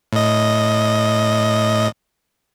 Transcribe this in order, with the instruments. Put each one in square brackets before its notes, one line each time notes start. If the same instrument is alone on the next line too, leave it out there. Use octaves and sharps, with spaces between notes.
[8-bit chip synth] A2 D#5